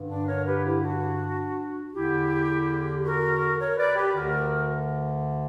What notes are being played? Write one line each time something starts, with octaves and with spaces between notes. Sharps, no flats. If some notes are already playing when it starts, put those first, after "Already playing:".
Already playing: G2 D3
D4
A#4 C#5
G4 B4
E4 G4
D4 F#4
E2 D3 E4 G4
F#4 A#4
A#4 C#5
B4 D5
G4 B4
D2 D3 F#4 A#4